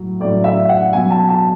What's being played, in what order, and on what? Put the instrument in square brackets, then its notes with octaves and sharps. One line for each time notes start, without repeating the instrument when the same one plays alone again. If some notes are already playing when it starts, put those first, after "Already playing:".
Already playing: [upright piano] A2 F#3
A2 D5
F#3
E5
F#5
B2 F#3 G#5
A5
A5